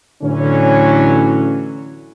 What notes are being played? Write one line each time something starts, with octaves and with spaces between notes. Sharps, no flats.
A2 D3 E3 F#3 C#4